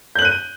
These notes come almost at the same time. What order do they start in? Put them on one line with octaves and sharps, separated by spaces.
G6 F#7 F#6 D#7